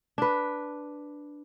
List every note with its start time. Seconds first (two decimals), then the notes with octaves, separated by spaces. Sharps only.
0.18 D4 B4